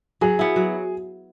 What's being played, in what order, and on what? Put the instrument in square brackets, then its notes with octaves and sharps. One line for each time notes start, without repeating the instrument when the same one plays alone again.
[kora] F#3 [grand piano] G#4
[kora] B3 E4
F#3